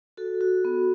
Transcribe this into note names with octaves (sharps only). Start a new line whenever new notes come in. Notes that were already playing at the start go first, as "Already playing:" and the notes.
F#4 A4
F#4
B3